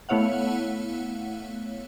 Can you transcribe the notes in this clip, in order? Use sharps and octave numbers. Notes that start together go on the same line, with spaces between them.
A3 B3 E4 C#5 F5 F#5